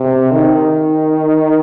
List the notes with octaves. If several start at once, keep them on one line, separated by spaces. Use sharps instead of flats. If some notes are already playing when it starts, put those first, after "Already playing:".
Already playing: C3
D#3